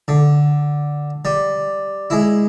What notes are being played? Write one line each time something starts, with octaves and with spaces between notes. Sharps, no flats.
D3
G3
G#3 E4